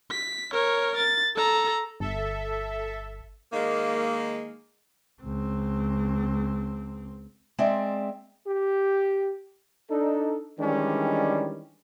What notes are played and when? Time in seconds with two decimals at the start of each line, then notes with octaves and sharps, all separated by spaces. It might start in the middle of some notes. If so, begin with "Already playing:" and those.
0.11 B6
0.53 A#4 C#5
0.97 A6
1.36 A4 A#5
2.00 G1 A4 E5
3.52 D#3 G#3 A#3
5.22 C#2 C4
7.59 G#3 C4 D5 E5
8.45 G4
9.90 D4 D#4 A4
10.60 D#3 E3 G3 G#3 C#4 D4